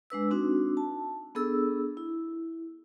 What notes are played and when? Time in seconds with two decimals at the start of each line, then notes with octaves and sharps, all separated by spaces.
0.10 G#3 D4 B4 E6
0.31 C4 D4 D#4 F#4
0.77 A5
1.35 B3 D4 G#4 A4 E6
1.97 E4